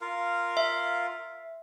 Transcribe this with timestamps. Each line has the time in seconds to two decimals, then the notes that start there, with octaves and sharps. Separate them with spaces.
0.01 F4 A#4 F5
0.57 E5